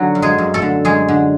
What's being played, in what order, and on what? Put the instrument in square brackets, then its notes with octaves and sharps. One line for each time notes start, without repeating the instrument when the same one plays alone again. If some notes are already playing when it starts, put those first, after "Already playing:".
Already playing: [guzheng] D3 F#3 F#4
F#2
G#3 G#4
F#2
A3 A4
D3
F#2 G#3 G#4
D3